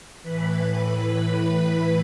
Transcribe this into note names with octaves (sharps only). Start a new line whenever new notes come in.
E3 B4 B5
A2
B4 B5
A2 E3 B4 B5
B4 B5